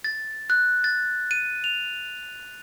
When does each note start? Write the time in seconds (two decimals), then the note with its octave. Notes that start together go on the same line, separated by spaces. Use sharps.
0.04 A6
0.50 F#6
0.84 A6
1.31 D#7
1.64 F7